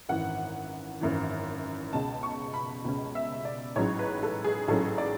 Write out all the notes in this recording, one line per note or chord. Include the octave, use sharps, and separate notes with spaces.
G#1 F#2 E3 F#5
G#1 F#2 E3
C#2 B2 G#3 C#4 A5
C#6
B5
C#2 B2 G#3 C#4
E5
D5
A1 G#2 F#3 C#4 C#5
B4
A4
G#4
A1 G#2 F#3 C#4 A4
D5